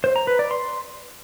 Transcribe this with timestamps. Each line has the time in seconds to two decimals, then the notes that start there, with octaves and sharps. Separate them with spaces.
0.04 C5
0.16 A#5
0.27 B4
0.39 D5
0.51 C6